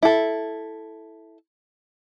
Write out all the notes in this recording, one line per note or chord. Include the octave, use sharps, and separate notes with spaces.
E4 A4